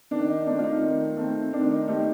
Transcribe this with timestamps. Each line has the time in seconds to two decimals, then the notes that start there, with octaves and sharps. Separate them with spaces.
0.11 D#3 D4
0.28 D#4
0.46 A3 C4 D4
0.58 F4
0.64 D#4
0.81 D#3
1.17 A3 C4
1.53 D#3 D4
1.71 D#4
1.88 A3 C4 D#4 G4